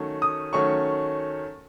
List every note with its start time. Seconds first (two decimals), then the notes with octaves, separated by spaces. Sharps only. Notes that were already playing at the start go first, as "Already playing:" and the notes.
Already playing: D#3 F#3 A3 C#4
0.22 D#6
0.53 D#3 F#3 A3 C#4 C#6